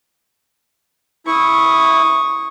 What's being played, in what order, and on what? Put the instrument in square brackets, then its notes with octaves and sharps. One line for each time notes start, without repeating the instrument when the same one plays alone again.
[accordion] E4 [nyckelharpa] C#6 D#6